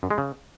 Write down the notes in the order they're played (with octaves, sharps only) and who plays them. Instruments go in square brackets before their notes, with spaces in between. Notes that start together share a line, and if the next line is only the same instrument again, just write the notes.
[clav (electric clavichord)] F#2
G#3
C#3